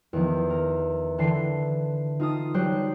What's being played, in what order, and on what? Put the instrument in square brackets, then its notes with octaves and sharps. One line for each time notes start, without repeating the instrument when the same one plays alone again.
[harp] E2 D#3 F3
A#4
D3 E3 A5 C6 C7
D#4 F4 A5 D#6
F#3 G3 G4 C5 F#6